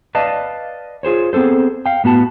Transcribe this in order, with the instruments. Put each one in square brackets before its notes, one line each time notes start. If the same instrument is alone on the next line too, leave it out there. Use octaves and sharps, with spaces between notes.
[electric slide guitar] B4 D5 D#5 F5 A5
F4 G#4 C5 C#5
B3 C4 G#4 A4 C5
F5 G5
A2 B3 F#4 A5